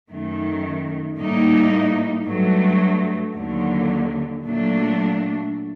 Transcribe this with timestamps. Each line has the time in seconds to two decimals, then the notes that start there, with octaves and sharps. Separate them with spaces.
0.11 F#2 D#3 A3
1.19 A2 G3 A#3 D#4
2.27 G2 F#3 A3
3.36 D#2 D3 F#3
4.44 A#2 F#3 A3 D4